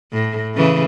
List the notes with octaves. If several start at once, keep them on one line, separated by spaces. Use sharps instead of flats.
A2
C#3 E3 A3